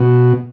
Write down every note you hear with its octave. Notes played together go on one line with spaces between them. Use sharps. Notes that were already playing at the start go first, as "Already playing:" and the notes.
Already playing: B2